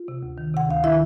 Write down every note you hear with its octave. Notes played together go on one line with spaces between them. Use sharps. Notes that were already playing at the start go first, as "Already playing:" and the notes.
Already playing: F4
C3
D2
D#3
C3 F#5
D2 F5
D#3 E4 E5